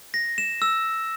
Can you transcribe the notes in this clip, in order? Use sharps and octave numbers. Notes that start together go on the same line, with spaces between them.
A#6
E7
E6